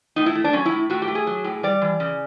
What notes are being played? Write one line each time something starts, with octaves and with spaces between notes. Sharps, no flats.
A2 D#4
E4
A3
D4
F#3 C#4
E4
A2
A2 F#4
G4
A3
G#4
F#3
A2
G3 D5
E3
C#3